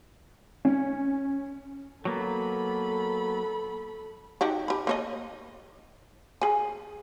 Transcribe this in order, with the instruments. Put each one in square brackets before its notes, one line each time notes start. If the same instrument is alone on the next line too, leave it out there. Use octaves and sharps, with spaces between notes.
[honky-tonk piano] C#4
[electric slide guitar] F#3 A#3 B3 [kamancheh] A4 B5
[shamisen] D#4 F#4 G4
G4 B5
A#3 C#5 D#5
G#4 G#5